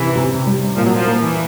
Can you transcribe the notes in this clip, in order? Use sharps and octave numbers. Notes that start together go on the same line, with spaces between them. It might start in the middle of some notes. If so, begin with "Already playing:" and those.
Already playing: C3 D#3 E3
C3
G3
A#2 F3
F#3
F3
A#3
E3